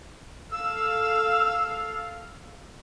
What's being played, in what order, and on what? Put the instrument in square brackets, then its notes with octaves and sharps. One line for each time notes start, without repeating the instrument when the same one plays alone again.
[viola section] A4 F5 [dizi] E6